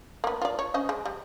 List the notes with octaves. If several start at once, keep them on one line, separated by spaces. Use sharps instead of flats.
A#3 B3
F4 D5
C#5
C#4 C5 D#5
G#3
G3